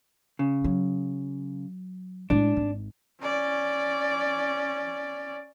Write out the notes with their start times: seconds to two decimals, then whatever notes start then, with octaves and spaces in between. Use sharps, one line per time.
0.39 C#3
0.64 F#3
2.30 A2 G#3 D4
2.57 G#1
3.21 C#4 D5